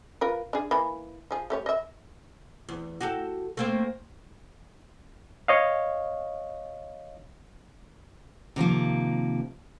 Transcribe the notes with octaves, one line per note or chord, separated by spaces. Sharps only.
F4 A#4 B4
D4 G#4
E3 A#3 B5
F3 G#4
A3 G4 C#5
D#5 E5
E2
F#4 G4 A4
A3 A#3 C4
C#5 D#5 F5
C3 D#3 F3 A#3